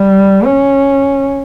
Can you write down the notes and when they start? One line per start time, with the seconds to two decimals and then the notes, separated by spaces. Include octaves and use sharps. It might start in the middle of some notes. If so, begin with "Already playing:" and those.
Already playing: G3
0.45 C#4